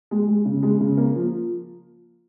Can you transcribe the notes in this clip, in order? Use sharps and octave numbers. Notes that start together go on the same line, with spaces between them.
G#3
G#3
C#3
G#3
C#3
A#3
F3